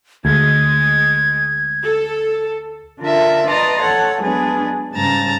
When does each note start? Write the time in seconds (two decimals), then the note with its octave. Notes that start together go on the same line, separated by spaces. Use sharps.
0.25 D2 G#3 G#6
1.83 A4
3.01 D3 D4 F4 A#4 E5
3.48 B4 D5 D#5 A5 A#5 C6
3.82 A4 C#5 F#5
4.23 F#3 G#3 B3 D4 G#4 B4
4.94 G#2 C#3 G3 A5 A#5 A6